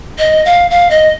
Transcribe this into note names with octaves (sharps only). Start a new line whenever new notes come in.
D#5
F5
F5
D#5